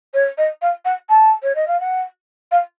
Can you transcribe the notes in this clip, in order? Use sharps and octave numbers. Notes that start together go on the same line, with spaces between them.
C#5
D#5
F5
F#5
A5
C#5
D#5
F5
F#5
F5